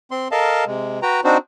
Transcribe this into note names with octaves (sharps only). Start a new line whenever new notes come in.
C4 C6
A4 A#4 D#5 F5 A5
C3 G#3
F#4 B4 G5 A#5
C4 D4 D#4 F#4 C5